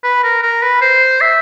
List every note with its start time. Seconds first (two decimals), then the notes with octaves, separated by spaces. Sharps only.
0.04 B4
0.23 A#4
0.43 A#4
0.62 B4
0.81 C5
1.21 E5